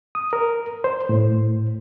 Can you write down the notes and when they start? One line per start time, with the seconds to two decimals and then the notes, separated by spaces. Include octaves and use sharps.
0.15 D#6
0.33 A#4
0.84 C5
1.09 A2